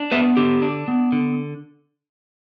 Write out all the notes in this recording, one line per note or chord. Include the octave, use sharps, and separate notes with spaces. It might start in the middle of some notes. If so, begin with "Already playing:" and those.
Already playing: D4
B3 B4 E5
D3 G4
D4
B3
D3